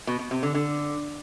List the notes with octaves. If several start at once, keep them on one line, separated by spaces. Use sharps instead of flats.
B2
B2
C3
D3
D3